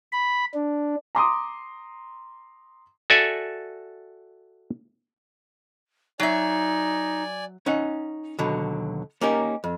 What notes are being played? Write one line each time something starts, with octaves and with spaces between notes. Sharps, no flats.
B5
D4
A#5 C6 D6 D#6
F#4 A4 D5 E5 G#5
F#3 D#4 D5 E5 G#5
C#4 D#4 F#5
D#2 B2 D3 F#3
A#3 C#4 D#4 G4 A#4
F2